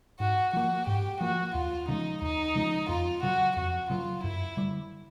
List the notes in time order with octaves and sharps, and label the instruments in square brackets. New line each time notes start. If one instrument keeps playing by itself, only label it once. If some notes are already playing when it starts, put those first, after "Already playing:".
[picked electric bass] G#2 [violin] F#4
[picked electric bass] F3 A#3 [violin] F#4
[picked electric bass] G#2 [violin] G4
[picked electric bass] F3 A#3 [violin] F#4
[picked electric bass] D#2 [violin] F4
[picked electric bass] C#3 F3 G#3 [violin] D#4
[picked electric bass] D#2 [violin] D#4
[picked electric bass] C#3 F3 G#3
[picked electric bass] F2 [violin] F4
[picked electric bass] C#3 F#3 [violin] F#4
[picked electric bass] F2 [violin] F#4
[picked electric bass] C#3 F#3 [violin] F4
[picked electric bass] F#2 [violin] E4
[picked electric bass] D3 G3